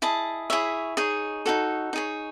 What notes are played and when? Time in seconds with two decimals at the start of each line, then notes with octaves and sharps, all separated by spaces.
0.02 E4 G#4 D#5 A5
0.50 E4 G#4 C#5 E5
0.97 D#4 G#4 C#5
1.46 D#4 F#4 A4 C#5
1.93 D#4 G#4 C#5